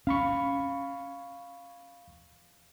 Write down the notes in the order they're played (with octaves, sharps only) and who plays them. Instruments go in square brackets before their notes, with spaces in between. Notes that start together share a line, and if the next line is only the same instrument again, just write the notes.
[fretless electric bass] C#4 [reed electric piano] F5 B5 C#6